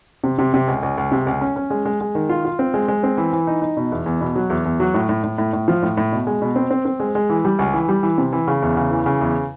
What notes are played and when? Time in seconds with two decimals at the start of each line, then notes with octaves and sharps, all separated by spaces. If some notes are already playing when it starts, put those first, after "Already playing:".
0.24 C3
0.38 C3
0.54 C3
0.68 C#2
0.83 C#2
0.98 C#2
1.12 C3
1.26 C#2
1.41 C#4
1.56 C#4
1.70 G#3
1.85 G#3
2.01 G#3
2.15 D#3
2.29 F4
2.45 F4
2.59 C4
2.74 G#3
2.88 G#3
3.03 C4
3.17 E3
3.33 E3
3.47 D#4
3.62 D#4
3.77 B2
3.92 E2
4.06 E2
4.21 B2
4.36 F#3
4.50 E2
4.65 E2
4.80 F#3
4.94 A2
5.09 A2
5.24 A2
5.38 A2
5.53 A2
5.68 F3
5.83 A2
5.97 A2
6.12 B2
6.27 G#3
6.42 B2
6.56 C4
6.71 C4
6.85 C4
7.00 G#3
7.15 G#3
7.30 E3
7.45 G3
7.59 C#2
7.74 E3
7.89 G3
8.03 E3
8.18 C3
8.33 E3
8.48 C#3
8.62 E2
8.77 C#3
8.91 E3
9.06 C#3
9.21 E2